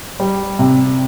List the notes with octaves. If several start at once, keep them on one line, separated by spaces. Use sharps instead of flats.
G3
C3